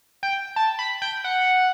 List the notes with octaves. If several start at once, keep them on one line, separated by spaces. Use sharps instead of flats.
G5
A5
B5
G5
F#5